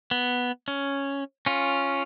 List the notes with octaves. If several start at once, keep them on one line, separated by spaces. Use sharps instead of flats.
B3
C#4
C#4 F4